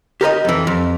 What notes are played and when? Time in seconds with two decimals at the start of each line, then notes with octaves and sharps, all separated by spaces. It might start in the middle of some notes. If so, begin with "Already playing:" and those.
0.21 G4 A#4 B4 D#5
0.45 F2 E3
0.67 F2